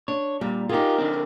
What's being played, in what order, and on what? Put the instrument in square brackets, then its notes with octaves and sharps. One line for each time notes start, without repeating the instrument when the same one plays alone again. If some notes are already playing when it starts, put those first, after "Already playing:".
[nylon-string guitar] D4 [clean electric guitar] C#5
[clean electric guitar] A#2 [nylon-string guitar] G3
[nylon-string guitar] D#4 G#4 [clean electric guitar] F4 G4 [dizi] A#4
[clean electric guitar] D3 C4